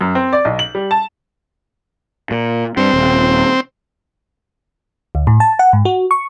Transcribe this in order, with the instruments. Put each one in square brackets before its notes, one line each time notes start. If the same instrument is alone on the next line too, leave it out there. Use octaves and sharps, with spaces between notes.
[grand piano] F#2
C4
D5
B1
F#7
G3
A5
[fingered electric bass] A#2
[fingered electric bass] G2 [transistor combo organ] C4
[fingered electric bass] D#1
[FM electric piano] D2
A2
A5
F#5
G#2
F#4
C#6